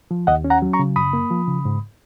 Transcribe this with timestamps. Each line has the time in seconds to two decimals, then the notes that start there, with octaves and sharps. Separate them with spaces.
0.11 F3
0.27 D#2 D#5 F#5
0.44 C#4
0.50 F#5 A#5
0.62 F#3
0.73 A#5 C#6
0.79 C#3
0.96 F#2 B5 D#6
1.13 A#3
1.30 F3
1.48 C#3
1.65 G#2